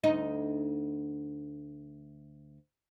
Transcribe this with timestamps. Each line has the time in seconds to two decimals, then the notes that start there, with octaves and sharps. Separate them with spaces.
0.04 D2 D#4 D#5